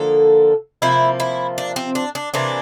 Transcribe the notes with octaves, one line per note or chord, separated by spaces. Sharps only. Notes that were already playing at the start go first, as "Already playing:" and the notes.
Already playing: D3 F3 A#3 A4
C3 F3 A#3 E4
E4
D4
C4
D4
D4
C3 E3 A#3 D4